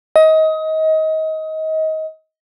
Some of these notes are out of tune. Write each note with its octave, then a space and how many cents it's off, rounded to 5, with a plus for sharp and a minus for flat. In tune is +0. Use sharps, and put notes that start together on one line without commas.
D#5 +25